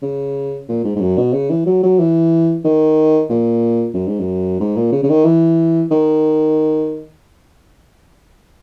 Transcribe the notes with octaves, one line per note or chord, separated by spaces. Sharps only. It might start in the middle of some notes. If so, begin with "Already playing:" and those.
C#3
A#2
G#2
G#2
F#2
B2
C#3
E3
F#3
F#3
E3
D#3
A#2
F#2
G#2
F#2
G#2
A#2
C#3
C#3
D#3
E3
D#3